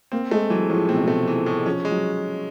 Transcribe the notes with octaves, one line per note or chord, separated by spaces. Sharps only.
A#3 C4
G#3 A3
E3 F#3
A2 F3
B2 C4
C3
B2 A3
E3
A2
F3 C#4
G#3
F#3